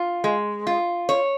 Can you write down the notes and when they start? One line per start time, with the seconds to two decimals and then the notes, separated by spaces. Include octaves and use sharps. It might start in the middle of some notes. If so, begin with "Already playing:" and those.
Already playing: F4
0.24 G#3
0.67 F4
1.09 C#5